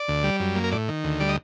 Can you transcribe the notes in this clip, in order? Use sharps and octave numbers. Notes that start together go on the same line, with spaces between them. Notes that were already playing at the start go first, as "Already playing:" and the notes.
Already playing: D5
D2
G3
F#2
A#3
A#4
A2 D5
D#3
D2
G3 D5
D#5